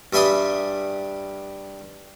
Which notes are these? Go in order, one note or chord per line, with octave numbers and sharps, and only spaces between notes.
G2 G3 E5 G#5 C6 D#6